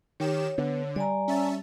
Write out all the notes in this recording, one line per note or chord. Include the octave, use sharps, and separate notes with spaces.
D#3 G4 C#5 E7
D3 B3
G3 D5 G#5 A#5
C#4 E5 A5